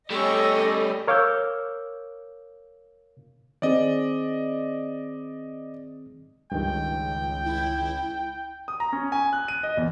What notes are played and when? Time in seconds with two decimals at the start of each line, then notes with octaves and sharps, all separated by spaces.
0.10 G3 A3 C#4 A4 D#5 G5 C#6
1.07 A#4 C#5 F5 D6 E6 G6
3.62 D#3 C4 G#4 D5 D#5
6.52 C#2 G2 D#3 G5
7.45 E4
8.68 D#6
8.80 A#5
8.93 C#4
9.12 G#5
9.33 F#6
9.48 D#7
9.63 D#5
9.77 E2